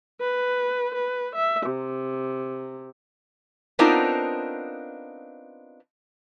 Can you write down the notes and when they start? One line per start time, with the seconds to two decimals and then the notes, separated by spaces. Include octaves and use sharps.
0.20 B4
0.94 B4
1.35 E5
1.66 C3
3.79 B3 C4 D4 D#4 F4 A#4